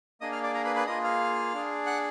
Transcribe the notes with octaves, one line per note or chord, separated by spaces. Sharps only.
A#3 D4 G#4 D#5 D#6
F5 F6
D5 D6
A#4 A#5
B4 B5
B4 B5
A#3 F4 G#4 D#5 D#6
F5 F6
D4 G#4
F#5 F#6